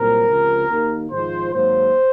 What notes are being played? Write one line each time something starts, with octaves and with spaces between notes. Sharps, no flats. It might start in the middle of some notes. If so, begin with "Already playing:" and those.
Already playing: C2 A#2 F#3 C4 A#4
C#2 C3 F3
D#2 D#3 A#3
G#1 G#2 F3 C5
G#1 G#2 F#3 A#3 C5